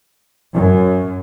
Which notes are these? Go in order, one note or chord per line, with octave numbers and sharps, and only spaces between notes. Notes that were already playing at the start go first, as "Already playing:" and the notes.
F#2